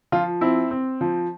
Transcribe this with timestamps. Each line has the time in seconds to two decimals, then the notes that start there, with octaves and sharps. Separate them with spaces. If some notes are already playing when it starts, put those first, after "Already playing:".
0.12 F3 F4
0.41 C4 E4
0.71 C4
1.01 F3